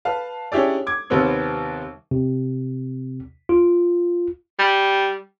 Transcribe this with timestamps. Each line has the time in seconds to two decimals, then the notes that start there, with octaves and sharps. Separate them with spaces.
0.05 B4 F5 A5
0.52 C#4 D4 E4 G4 G#4 D5
0.87 D6 G#6
1.10 D#2 C3 G3 B3 C4 D#4
2.11 C3
3.49 F4
4.59 G3